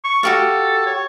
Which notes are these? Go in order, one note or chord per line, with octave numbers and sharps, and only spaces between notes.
C#6
F#4 G4 A4 F5
C#5